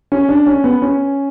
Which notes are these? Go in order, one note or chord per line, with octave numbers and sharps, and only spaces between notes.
C#4
D4
C#4
B3
C#4